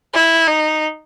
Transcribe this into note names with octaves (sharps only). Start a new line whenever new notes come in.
E4
D#4